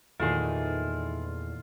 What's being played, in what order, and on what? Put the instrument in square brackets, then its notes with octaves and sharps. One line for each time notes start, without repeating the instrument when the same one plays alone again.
[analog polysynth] E2 [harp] A#2 D#3 A3 [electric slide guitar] E4 G#4 [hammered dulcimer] F4